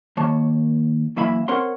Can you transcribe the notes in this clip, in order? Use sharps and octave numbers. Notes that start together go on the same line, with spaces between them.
D#2 A#3 C#5 A5
F#2 E3 A#3 E5 F5 B5
C4 A#4 C#5 F#5 C6